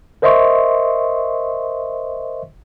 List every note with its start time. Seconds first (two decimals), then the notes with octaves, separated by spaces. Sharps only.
0.22 A#4 C5 D#5 E5 C6 C#6